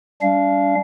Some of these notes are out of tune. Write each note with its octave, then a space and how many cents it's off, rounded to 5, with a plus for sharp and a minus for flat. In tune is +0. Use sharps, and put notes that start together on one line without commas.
G3 +0 D4 -40 F5 -25